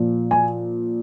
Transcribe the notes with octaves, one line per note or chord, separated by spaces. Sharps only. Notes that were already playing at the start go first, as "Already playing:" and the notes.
Already playing: A#2 F3
G#5